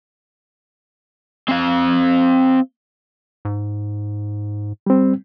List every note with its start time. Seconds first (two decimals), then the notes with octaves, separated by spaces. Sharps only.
1.49 C4 F5
3.45 G#2
4.86 G3 C4